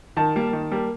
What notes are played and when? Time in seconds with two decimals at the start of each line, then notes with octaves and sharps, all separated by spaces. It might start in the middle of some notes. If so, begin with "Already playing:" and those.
0.17 D#3 A5
0.36 G3 A#3
0.53 D#3
0.71 G3 A#3